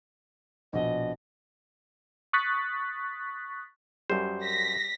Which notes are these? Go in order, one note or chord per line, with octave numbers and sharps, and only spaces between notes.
A#1 B2 D#5
C#6 D#6 F#6 A6 B6
F#2 G3 C5
A#6 B6